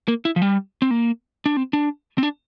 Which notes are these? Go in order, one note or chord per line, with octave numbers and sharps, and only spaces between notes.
A#3
E4
F3
G3
C4
A#3
D4
C4
D4
C4
D4